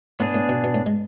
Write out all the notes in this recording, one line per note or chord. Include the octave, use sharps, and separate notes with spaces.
A2 B3 D4 G#4
A2
B2
B2
A2
G#3